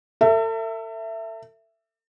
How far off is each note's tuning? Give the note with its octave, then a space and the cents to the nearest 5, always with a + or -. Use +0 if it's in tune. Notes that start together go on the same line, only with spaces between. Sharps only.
A4 +40 E5 +10